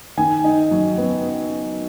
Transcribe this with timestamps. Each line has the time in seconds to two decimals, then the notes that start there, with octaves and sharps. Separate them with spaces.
0.17 D#3 G#5
0.44 D#4
0.71 F#3
0.98 B3